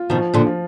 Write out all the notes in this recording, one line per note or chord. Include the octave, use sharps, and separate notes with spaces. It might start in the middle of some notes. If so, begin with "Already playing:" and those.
Already playing: F4
B2 D#3 F3
A#2 D3
F3